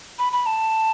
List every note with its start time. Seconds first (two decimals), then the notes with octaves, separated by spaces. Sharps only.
0.19 B5
0.33 B5
0.46 A5